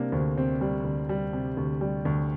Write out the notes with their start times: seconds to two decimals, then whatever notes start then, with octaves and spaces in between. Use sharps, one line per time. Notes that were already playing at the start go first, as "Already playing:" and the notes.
Already playing: C3 G3 A#3 D4
0.12 D2 C4
0.37 C3 C4
0.61 G3
0.85 D2
1.09 G3
1.33 C3
1.57 D2
1.81 G3
2.05 D2